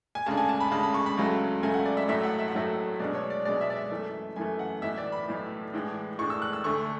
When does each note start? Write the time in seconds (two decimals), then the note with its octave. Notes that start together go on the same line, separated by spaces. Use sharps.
0.15 G#5
0.26 D2 C#3 G#3 D4 A5
0.37 G#5
0.49 A5
0.60 B5
0.71 D2 C#3 G#3 D4 A5
0.83 B5
0.94 C#6
1.06 B5
1.17 C#2 C#3 F#3 A3
1.63 C#2 C#3 F#3 A3 G#5
1.74 F#5
1.85 D5
1.97 E5
2.08 A1 A2 F#3 A3 E5
2.23 F#5
2.39 E5
2.48 F#5
2.54 A1 A2 F#3 A3 E5
3.00 B1 B2 G#3 D4 D5
3.15 C#5
3.30 D5
3.45 B1 B2 G#3 D4 D5
3.61 E5
3.70 D5
3.76 E5
3.91 F#2 E3 A3
4.36 F#2 E3 A3 G#5
4.59 F#5
4.82 B1 A2 E3 E5
4.97 D5
5.12 B5
5.28 B1 A2 E3
5.74 A2 E3 G#3 D4
6.19 A2 E3 G#3 D4 C#6
6.30 E6
6.42 F#6
6.53 E6
6.64 D2 D3 A3 C#6